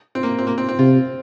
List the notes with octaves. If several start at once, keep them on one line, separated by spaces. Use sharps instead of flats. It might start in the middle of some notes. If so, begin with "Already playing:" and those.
C4
A#3
C4
A#3
C4
C4
C3 F4